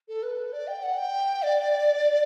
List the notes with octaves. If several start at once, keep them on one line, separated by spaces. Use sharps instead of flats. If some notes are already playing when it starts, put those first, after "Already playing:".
A4
B4
D5
G5
F#5
G5
D5